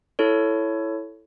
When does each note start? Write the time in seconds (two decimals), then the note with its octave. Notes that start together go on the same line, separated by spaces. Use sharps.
0.19 E4 A4 C#5